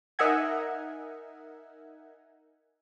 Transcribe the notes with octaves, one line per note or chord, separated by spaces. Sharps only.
D#4 A#4 E5 F#5 G#5